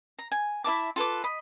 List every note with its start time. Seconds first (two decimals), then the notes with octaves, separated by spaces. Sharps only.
0.19 A#5
0.32 G#5
0.64 E4 E5 A5 D6
0.96 F4 A4 B4 D6
1.24 D#5 B5